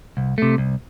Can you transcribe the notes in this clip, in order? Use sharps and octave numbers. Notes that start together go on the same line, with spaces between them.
C2
C3 A3
C2